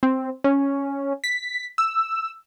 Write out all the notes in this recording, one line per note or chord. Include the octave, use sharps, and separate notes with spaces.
C4
C#4
B6
E6